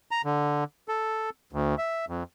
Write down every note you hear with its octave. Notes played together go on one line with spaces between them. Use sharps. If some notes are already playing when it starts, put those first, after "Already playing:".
A#5
D3
A4
D2
E5
F2